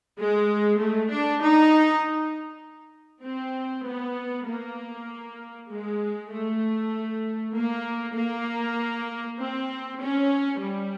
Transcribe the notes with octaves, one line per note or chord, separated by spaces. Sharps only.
G#3
A3
D4
D#4
C4
B3
A#3
G#3
A3
A#3
A#3
C4
C#4
G3